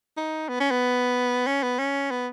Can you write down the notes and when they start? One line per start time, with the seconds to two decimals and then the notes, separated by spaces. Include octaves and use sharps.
0.17 D#4
0.49 B3
0.60 C#4
0.71 B3
1.47 C#4
1.63 B3
1.79 C#4
2.11 B3